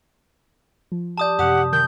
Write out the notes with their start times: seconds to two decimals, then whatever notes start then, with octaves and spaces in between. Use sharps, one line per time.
0.92 F3
1.18 G4 D5 A5 D#6 G6
1.39 F#2 C3 G4 F#5 D#6
1.73 F#2 D#3 G6